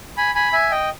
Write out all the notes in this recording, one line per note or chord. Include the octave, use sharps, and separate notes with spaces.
G#5 B5
G#5 B5
E5 G#5
D#5 G5